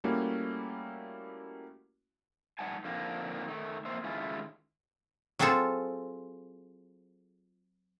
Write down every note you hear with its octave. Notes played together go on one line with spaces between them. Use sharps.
G3 A3 A#3 C#4 E4 F#4
G3 D#4 F#5 G#5 A5
D3 F3 A#3 C4 D4 D#4
D#3 A3
F2 A#3 C5 E5
D#3 G#3 A3 C#4 E4 F4
F#3 C4 F4 G#4 A4 C5